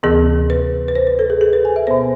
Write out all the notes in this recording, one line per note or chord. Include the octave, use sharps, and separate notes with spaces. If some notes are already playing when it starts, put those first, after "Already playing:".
D2 C3 E3 B3 G#4
B4
B4
C5
B4
A4
G#4
G#4
B4
G#5
E5
B2 B3 C5